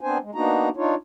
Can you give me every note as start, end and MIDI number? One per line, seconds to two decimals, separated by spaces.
0.01 0.18 59
0.01 0.18 60
0.01 0.18 62
0.01 0.18 72
0.01 0.18 80
0.23 0.31 56
0.35 0.69 58
0.35 0.69 59
0.35 0.69 62
0.35 0.69 63
0.35 0.69 66
0.35 0.69 82
0.77 0.95 62
0.77 0.95 63
0.77 0.95 65
0.77 0.95 73